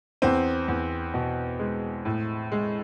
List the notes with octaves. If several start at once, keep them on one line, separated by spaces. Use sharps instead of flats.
E2 C4
E2
B2
G#3
A2
G#3